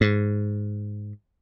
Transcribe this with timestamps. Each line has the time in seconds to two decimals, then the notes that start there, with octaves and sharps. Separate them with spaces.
0.01 G#2